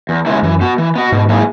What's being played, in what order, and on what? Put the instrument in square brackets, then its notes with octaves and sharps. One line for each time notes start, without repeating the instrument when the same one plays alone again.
[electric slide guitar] E2
C#3 G#3 B3 E4
[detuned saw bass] F#2 [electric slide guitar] E3
[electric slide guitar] B3 F#4
E3
B3 F#4
[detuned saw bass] G#2 [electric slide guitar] B2
[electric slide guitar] F#3 A#3 E4 G#4